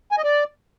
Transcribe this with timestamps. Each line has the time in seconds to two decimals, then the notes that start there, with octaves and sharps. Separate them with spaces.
0.12 G#5
0.18 D#5
0.24 D5